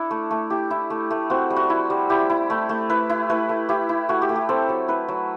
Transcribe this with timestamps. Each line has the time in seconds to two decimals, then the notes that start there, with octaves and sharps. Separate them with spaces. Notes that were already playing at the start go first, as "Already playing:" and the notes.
Already playing: D4 E4 A4
0.11 A3
0.31 A3
0.50 E4 G4
0.71 E4
0.90 A3
1.11 A3
1.30 C4 F#4
1.50 G3
1.56 F#4
1.70 E4
1.90 G3
2.10 E4 G4
2.30 E4
2.50 A3
2.69 A3
2.89 E4 B4
3.10 E4
3.29 A3 B4
3.49 A3
3.69 E4 G4
3.89 E4
4.09 A3 F#4
4.22 G4
4.29 A3
4.36 G4
4.49 C4 A4
4.69 F#3
4.88 E4 B4
5.08 F#3